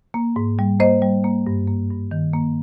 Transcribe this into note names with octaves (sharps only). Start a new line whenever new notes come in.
A#3
G#2
G3
A#3 C5 D#5
G3
A#3
G2
A#3
G2
D#3
A#3